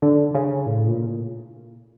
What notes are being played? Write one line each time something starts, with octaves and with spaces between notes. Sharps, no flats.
D3
C#3
A2
A#2